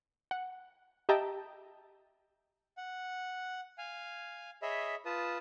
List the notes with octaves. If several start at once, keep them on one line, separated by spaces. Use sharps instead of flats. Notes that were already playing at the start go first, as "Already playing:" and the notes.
F#5
G4 D#5 E5 G5 A5 A#5
F#5
F5 G#5
G#4 C#5 D#5 E5 B5
F4 B4 A5 D#6